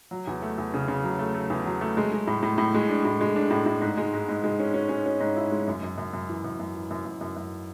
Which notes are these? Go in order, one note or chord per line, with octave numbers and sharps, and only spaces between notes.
F#3
E2
A3
E2
C#3
C#3
F#3
A3
A3
E2
F#3
A3
G#3
G#3
A2
A2
A2
G#3
D4
A2
G#3
D4
A2
A2
G#2
G#3
G#2
G#2
G#3
C#4
C#4
C#4
C#4
G#2
E4
G#3
F#2
F#2
F#2
F#2
E3
F#2
F#2
E3
F#2
F#2
F#2
F#2